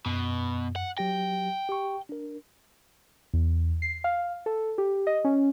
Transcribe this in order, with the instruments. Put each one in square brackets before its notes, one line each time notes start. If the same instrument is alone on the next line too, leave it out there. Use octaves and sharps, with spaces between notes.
[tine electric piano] F#2 [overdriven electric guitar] B2
[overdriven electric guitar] F#5
[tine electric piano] F#3 G4 A#6 [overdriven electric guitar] G5
[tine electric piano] G4 C#6
D4 A#4
[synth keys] E2
C7
F5
A4
G4
D#5
C#4